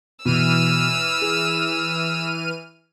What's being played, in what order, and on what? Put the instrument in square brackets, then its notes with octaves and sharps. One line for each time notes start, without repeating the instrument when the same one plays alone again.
[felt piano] B2 [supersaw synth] E3 F6 D#7 [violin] E6
[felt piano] G#4